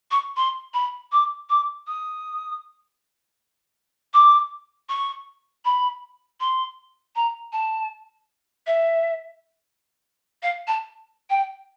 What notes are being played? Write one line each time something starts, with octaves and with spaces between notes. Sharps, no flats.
C#6
C6
B5
D6
D6
D#6
D6
C#6
B5
C6
A#5
A5
E5
F5
A5
G5